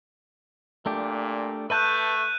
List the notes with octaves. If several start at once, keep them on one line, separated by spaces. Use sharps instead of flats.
A#2 A3 D4 G4
A3 B4 E5 A5 F#6 G6 D#7